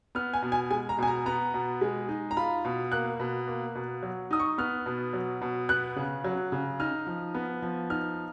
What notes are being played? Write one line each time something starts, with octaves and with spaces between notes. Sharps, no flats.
B3 F6
G#5
B2
G#5
G#3 G#5
A#5
B2 G#5
A#5
B3 A#5
B2
G#3
D#4
A#5
F4 B5
B2
A#3 F#6
B2
A#3
B2
F#3
D#4 D#6
C#6
B3 F6
B2
F#3
B2
B3 F#6
C#3
F#3
C#3
D#4 F6
F3
B3
F3
D#4 F6